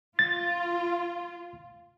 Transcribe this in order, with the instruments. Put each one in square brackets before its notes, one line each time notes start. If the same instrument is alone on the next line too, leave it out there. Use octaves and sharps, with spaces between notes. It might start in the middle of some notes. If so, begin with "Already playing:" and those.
[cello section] F4 [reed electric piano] A6